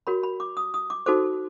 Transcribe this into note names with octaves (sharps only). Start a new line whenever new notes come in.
F#4 A#4 C#5 B5
B5
D6
D#6
D#6
D6
D#4 F#4 A4 C5 D6